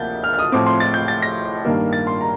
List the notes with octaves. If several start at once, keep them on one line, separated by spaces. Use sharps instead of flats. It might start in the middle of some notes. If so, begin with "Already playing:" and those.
Already playing: D2 C3 F3 A#3 G6 A6
F6
F6
D#6
A2 F3 C4 D6
C6
A6
G6
A6
A#6
G2 D#3 A#3
A6
C6
A#5